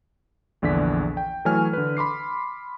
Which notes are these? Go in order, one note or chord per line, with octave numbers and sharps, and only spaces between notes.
A#1 E2 D3 D5 B6
G5
E3 F#3 A3 C#5 G#5 F6
D3 B4
B5 C6 D6 C7